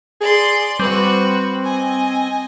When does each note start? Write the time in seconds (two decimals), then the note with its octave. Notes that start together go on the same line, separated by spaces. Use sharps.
0.20 G#4 D5 C6
0.80 G3 C4 F#4 B4
1.64 D#5 G#5